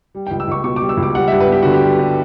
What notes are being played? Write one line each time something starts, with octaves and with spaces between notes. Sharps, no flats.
G3
G5
C#2
E6
C#2 C#6
B2 C#6
D6
G3
E6
C#2
D6
G3 F#5
E5
G2
B4
B3 G4
D3 F#4
G4
G3
G2